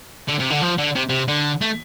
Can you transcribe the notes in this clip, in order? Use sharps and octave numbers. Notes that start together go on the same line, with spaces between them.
D3
C3
D3
F3
D3
C3
C3
D3
A3